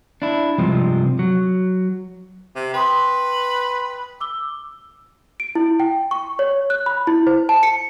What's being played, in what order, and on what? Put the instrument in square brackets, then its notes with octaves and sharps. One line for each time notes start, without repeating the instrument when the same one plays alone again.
[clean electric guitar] D4 E4
G2 C3 F3 G#3 C4
F#3
[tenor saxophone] C3
[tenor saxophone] B4 [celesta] G5 C6 D#6
[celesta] D6 E6 G7
D7
E4
G5
C#6
C#5
F#6
B5
E4
C5
A5
C#7